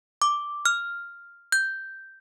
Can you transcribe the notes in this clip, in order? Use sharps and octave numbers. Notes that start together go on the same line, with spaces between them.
D6
F6
G6